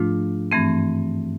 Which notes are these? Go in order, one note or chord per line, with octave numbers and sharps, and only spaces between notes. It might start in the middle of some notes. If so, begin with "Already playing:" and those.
Already playing: G#2 F3 A3 D4 F4
G2 E3 A3 C4